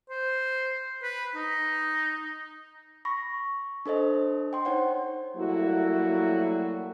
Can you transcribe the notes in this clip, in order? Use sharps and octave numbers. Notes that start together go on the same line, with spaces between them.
C5
B4
D#4
B5 C#6 A#6
D4 A4 C5 D#5
G5 C6
D#4 C5 C#5 F#5
F#3 G3 A3 A#3 E4 F#4